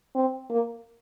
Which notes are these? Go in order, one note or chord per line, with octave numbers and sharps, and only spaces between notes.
C4
A#3